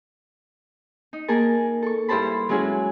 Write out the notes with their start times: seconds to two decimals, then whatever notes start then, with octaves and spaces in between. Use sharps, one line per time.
1.13 D#4
1.28 A#3 G#4 A#4 A5
1.82 A4 C#6
2.08 G2 E4 G4 C5 A5 B5
2.49 F#3 G#3 C#4 E4 G#4